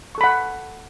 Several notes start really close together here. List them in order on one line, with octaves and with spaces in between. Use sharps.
C#6 A4 B5 F#5